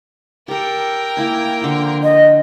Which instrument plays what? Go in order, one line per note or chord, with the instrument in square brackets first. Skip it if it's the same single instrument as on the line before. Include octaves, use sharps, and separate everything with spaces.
[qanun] G4 A4 [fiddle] A#4 G5
[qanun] A#3 E4 G#5
D3 F3
[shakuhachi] D#5